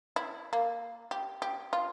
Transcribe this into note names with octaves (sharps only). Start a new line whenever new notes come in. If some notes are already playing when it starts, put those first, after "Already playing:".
E4
A#3
G4
G4
F4